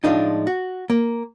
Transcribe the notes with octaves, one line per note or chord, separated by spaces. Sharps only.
A2 F3 G#3 D4 D#4 F4
F#4
A#3